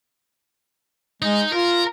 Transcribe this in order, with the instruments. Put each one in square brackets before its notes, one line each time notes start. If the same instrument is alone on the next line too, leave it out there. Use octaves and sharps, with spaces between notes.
[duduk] G#3 [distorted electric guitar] D#4
[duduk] F4 [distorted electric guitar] A#4